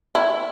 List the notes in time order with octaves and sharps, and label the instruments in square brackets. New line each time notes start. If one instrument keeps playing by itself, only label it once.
[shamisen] E4